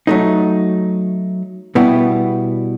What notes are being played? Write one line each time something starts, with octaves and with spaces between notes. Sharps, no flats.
F#3 A3 D#4
B2 G3 B3 E4